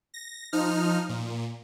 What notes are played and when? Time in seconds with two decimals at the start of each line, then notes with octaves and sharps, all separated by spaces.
0.14 A#6
0.53 F3 D#4 F6
1.09 A#2